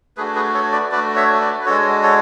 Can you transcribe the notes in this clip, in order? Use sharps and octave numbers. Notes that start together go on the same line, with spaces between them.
A3 D4 F#4 G#4 B4
G#4 B4
A4 C#5
B4 D5
A3 D4 F#4 B4 D5
C#5 E5
B4 D5
B4
G#3 D4 F#4 A4 C#5
A4 C#5